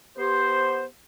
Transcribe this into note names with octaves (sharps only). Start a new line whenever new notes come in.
B3 G4 C5